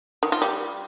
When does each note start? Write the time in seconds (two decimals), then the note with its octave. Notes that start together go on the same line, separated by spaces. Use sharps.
0.23 D#3
0.32 F4
0.42 G3